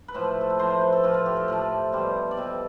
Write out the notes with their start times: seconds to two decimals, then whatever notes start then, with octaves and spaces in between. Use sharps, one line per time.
0.08 B4
0.14 A2 F3 A3 C5
0.41 A4
0.50 B4
0.59 A2 F3 A3 C5
0.70 C5
0.81 B4
0.93 A4
1.03 A2 F3 A3 F4
1.14 F4
1.26 G4
1.37 A4
1.48 A2 F3 A3
1.92 B2 G3 C5
2.31 D5
2.37 B2 G3 E5